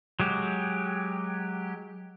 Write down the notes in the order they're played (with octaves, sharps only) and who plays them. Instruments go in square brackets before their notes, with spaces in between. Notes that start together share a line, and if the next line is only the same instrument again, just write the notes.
[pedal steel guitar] F#3 G#3 G4